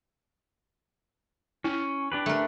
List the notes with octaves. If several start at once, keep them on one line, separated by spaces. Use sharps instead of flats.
C#4 E4
D4 G4 B4
A3 A#4